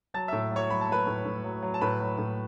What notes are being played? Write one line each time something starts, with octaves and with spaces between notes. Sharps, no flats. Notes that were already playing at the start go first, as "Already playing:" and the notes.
F#3 A5 A6
A2 E5 E6
F#3 C#5 C#6
F#3 B5
A5
F#3 B4 B5
A2
A2
F#3
F#3
A5
A2 B4 B5
F#3
A2